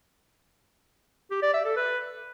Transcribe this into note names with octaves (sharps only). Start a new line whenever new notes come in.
G4
D5
E5
A4
B4